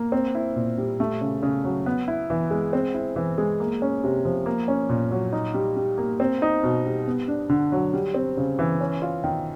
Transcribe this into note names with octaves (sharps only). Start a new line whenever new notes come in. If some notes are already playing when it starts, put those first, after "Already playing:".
Already playing: A#3
C4
E4
A#2
G3
A3
C#3
C#3
F#3
B3
E4
E3
G#3
C4
E4
E3
G#3
A#3
C#4
C3
F3
A#3
C#4
A#2
F#3
D#4
G3
G3
A#3
C4
D#4
B2
G3
B3
D4
D3
F#3
G3
C4
C#3
E3
C#4
F4
D#3